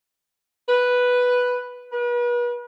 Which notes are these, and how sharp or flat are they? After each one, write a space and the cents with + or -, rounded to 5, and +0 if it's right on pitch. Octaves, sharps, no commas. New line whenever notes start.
B4 +0
B4 -40